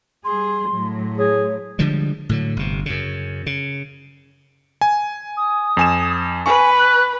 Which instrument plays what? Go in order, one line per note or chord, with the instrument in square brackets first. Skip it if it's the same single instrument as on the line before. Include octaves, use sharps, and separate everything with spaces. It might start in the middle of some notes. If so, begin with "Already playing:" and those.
[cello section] G3 G#4 [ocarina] C6
[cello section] A2 F#3
[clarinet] G#4 [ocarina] C#5
[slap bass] D3 F3 G3 G#3
A2 D3 F#3
G1 C3
F#2 C#3
C#3
[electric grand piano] G#5
[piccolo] D#6
[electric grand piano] F2 G#5 E7
[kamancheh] B4 [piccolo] G#5 [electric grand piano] C#6
[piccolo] F#6